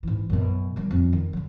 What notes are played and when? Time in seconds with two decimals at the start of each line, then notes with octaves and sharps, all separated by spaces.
0.03 G#2 E3
0.29 F#2 B2
0.76 D#3 G3
0.91 F2
1.13 D#3
1.33 D3 F#3